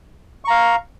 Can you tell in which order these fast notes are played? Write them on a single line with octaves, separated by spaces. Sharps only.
C#6 A#5 F5